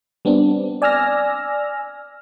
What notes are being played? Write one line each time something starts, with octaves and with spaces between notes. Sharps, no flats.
G3 B3 C4 D4
D5 G#5 E6 F6 A#6